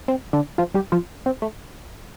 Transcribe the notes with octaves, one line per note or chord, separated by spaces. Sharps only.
C4
D3 D4
F3 F4
G3 G4
F3 F4
C4
A3